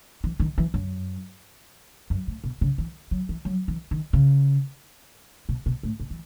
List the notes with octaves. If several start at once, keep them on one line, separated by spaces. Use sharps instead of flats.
E3
D#3
E3
F#2
F#2
A2
B2
C#3
E3
F#3
E3
F#3
E3
D#3
C#3
B2
B2
A2
B2
E3